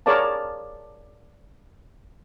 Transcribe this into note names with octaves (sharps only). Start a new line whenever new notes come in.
G#4 A#4 C#5 D5 F5 A5